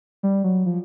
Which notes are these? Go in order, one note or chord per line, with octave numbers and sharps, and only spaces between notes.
G3
F#3
F3